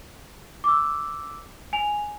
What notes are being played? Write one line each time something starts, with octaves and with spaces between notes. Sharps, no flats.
D6 E6
G#5 F7